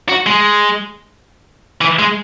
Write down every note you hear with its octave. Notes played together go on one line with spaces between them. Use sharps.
F#4
G#3
E3
G#3